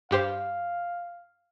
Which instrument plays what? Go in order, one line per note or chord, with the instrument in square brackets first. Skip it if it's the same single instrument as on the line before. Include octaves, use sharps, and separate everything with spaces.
[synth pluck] G2 G4 C5 [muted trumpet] F5